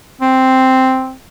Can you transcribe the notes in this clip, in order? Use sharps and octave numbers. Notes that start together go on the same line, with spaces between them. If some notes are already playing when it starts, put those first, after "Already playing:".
C4